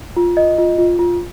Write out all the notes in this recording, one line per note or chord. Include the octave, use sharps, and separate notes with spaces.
F4
D#5
F4
F4
F4